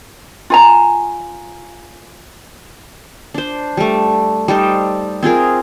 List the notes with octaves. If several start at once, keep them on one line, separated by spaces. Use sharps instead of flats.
F4 G#5 A#5
D4 C5
G3 A3
G3 D#4 A4 C5
C4 F4 G#4 A#4